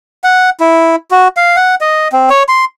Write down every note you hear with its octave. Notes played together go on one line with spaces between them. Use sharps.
F#5
E4
F#4
F5
F#5
D#5
C4
C#5
C6